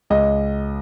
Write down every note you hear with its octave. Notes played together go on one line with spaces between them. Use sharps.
C#2 D#5